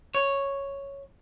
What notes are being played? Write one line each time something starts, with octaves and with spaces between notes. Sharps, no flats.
C#5